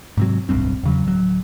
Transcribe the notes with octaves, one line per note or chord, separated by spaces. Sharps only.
G#2 C3 F#3
D1 B1 G2 C4
E2 C#3 F#3
D1 F#3